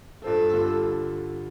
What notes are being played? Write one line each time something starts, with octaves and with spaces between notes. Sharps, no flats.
G2 G3 F4 A4 C5
D3 G3 F4